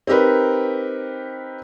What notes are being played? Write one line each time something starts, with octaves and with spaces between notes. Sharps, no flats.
C4 D#4 G4 A#4 B4